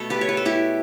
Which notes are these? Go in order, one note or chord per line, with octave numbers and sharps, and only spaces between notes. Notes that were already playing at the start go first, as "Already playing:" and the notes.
Already playing: B2 A3 A4
G4 B4
C#5
B4
A4
E4 G4